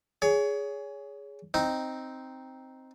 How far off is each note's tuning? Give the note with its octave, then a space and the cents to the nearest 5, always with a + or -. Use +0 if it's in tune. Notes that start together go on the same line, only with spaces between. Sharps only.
G#4 +0 C#5 +25
C4 +0 D#4 +0